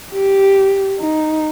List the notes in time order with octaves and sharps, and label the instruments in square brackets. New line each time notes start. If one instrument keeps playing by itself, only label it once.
[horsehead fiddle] G4
D#4